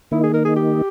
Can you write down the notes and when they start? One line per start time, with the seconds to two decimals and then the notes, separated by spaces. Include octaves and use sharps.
0.12 D#3 A#3 D#4 E4
0.23 G#4
0.33 A#4
0.45 G#4
0.56 G4